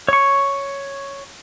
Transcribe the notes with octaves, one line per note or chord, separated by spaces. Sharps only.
C#5 C#6